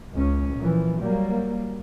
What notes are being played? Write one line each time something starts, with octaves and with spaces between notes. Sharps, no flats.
C#2 C#4
A#2 E3 F3
F#3 G3 A#3